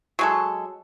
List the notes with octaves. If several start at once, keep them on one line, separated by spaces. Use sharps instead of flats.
F#3 G#3 A4